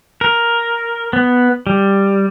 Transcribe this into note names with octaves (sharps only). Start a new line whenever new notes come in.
A#4
B3
G3